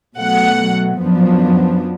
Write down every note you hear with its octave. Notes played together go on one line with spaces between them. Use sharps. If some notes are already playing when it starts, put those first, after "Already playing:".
B2 F#3 A3 F#5
F#2 F3 B3 D4